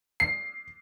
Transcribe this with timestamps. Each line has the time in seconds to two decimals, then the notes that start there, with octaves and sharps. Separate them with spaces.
0.20 C7